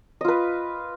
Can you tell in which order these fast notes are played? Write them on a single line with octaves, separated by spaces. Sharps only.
D#5 F4 B4